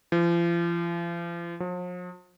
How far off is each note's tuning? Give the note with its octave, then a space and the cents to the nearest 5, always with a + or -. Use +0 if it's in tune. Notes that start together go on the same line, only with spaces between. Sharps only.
F3 -40
F3 +45